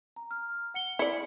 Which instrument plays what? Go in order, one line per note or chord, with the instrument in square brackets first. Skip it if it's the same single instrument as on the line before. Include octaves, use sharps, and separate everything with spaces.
[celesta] A#5
F6
F#5 C#7 G7
[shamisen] E4 D5 [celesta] C5 C#7